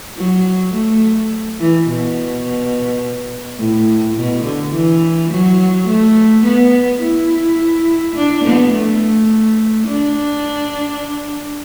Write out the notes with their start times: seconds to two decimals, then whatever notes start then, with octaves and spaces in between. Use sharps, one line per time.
0.17 F#3
0.74 A3
1.59 E3
1.88 B2
3.59 A2
4.17 B2
4.44 D3
4.73 E3
5.31 F#3
5.88 A3
6.45 B3
7.01 E4
8.16 D4
8.44 B3
8.73 A3
9.87 D4